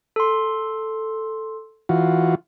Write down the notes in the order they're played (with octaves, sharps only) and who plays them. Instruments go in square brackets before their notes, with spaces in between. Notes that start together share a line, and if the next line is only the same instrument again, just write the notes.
[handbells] A4 C6
[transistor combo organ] E3 F4 F#4